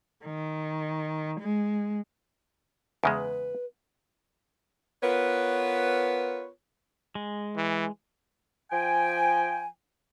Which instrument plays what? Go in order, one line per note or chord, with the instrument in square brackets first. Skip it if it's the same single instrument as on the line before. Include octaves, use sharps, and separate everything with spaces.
[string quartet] D#3
G#3
[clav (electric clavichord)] E2 C#3 G#3 [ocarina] B4
[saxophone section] B3 F4 A#4 B4 C#5
[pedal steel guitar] G#3
[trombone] E3
[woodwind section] F3 G5 G#5